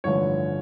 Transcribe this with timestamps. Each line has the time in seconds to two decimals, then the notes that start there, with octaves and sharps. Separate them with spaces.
0.04 A1 G2 D3 F3 C#5